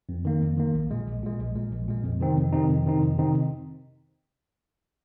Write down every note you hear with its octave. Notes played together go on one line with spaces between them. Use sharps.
F2
D#3 A#3
F2
D#3 A#3
A#1
A#2 G#3
A#1
A#2 G#3
A#1
A#2 G#3
A#1
A#2 G#3
F2
C3 D#3 C4 D#4
F2
C3 D#3 C4 D#4
F2
C3 D#3 C4 D#4
F2
C3 D#3 C4 D#4